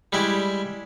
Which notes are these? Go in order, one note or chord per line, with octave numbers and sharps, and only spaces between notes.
G3 G#3 E4 G4